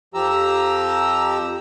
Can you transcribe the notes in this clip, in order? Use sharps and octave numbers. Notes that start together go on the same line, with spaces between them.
F2 F3 G4 A#5 E6